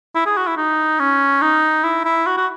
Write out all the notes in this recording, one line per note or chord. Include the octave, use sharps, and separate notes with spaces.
E4
G#4
F#4
E4
D#4
C#4
D#4
E4
E4
F#4
F#4